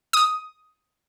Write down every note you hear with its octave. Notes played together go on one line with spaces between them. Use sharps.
D#6